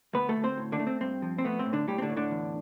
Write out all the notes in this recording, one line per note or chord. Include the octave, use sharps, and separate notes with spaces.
D2 B3 B4
A3 A4
D2
C4 C5
A2
D3 D4
A3
C4
G2 C4
F3
C4
A3 B3
C4
A2
D3 D4
A2 G3 G4
C4
D3 D4
A2
D3 D4
E2